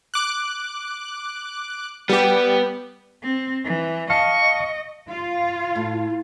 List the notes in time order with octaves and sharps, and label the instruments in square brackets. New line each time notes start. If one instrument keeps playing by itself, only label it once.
[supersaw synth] D6 F#6
[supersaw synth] G3 G4 [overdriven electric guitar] B3
[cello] C4
E3
[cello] D#5 [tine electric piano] F5 A5 [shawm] C#6
[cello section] F4 F5
[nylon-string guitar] A2